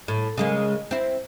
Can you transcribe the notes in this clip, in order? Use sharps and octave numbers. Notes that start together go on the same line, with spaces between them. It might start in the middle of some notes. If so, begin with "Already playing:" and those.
A2
C#3 G#3 A#3
C4 E4